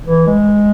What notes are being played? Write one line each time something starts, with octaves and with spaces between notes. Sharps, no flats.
E3
G#3